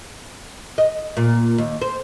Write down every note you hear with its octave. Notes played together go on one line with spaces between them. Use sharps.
D#5
A#2
D#2
C5